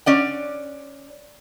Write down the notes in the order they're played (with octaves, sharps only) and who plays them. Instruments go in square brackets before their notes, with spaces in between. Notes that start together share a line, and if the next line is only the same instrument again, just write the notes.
[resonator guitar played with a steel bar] C#4 D5 F#5